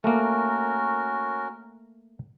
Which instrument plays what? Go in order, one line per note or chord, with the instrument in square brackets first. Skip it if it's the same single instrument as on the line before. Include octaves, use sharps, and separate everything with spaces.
[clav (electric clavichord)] A3 A#3 [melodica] C#4 F#4 A#4